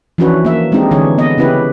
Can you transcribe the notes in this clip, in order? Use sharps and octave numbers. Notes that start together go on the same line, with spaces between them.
E3 F3 C#4 D4 F#4 B4
A#3 E5
G#3 C4 D4 D#4 G4
D3 E3 D4 G#4 C#5
B3 D#5
C#3 C#4 E4 G4 B4